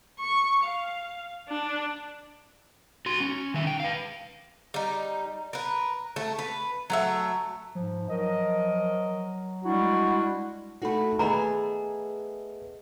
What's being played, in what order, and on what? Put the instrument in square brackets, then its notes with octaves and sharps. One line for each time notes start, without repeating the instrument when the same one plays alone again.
[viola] C#6
F5
D4
[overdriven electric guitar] F#4 C6
C#4
D#3 E5
G5
B4 F5
[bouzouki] G3 D#4
A#4 B4
A3 A5
B4
F#3 A3 E5
[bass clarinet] G#2 [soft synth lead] F3
[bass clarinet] F#3 [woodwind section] A#4 D#5
[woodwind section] G3 G#3 D4 [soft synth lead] E4 [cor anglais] F#4
[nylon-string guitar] A3 F#4 [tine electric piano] D#4 A4 B5
[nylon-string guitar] A3 B3 G#4 [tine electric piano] B4 D#5 [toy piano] A#5 B5